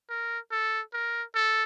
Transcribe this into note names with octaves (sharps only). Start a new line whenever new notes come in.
A#4
A4
A#4
A4